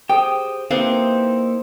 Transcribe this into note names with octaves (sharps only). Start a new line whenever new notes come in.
G4 G#4 C5 G5 D#6
A#3 C4 D#4 E4 G4 B4 F5